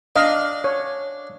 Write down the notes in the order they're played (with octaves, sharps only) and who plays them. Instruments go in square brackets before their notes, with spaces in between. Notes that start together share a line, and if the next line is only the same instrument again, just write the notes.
[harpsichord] D4 [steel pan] D#5 F5
[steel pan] C#5